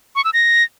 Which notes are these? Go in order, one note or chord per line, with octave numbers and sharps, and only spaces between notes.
C#6
E6
A#6